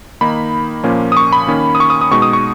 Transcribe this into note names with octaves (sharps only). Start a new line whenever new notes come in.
D#3 A#3 D#4 B5
A#2 F3 A#3 C#4
D#6
C#6
B5
D#3 A#3 C#4
D#6
C#6
D#6
D#6
B2 G#3 D#4 C#6
D#6
C#6